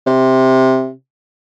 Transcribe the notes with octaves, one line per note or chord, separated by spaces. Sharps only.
C3